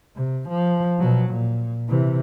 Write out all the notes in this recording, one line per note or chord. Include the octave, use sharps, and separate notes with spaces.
C3
F3
B2 F#3
A#2
C3 E3